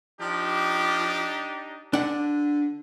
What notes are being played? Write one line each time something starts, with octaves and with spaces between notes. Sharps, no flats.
F3 D4 D#4 G4
D3 D4 F#5